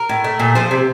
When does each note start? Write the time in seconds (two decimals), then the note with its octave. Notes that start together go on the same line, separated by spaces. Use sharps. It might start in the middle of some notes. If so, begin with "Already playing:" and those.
Already playing: A#4
0.09 A2
0.24 A3
0.40 A#2
0.55 F3 C5
0.71 C3